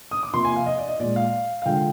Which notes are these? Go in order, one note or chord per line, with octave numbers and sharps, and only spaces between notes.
D#6
D6
C3 F3 A#3 C6
G#5
F5
D#5
D5
D#5
A#2 G#3 D5
F5
F5
D3 F3 G#3 G5